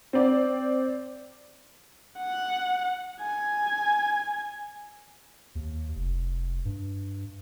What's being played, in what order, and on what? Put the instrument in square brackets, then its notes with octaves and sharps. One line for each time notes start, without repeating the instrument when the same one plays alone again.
[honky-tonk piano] C4 D5
[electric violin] F#5
G#5
[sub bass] D#2
F1
G2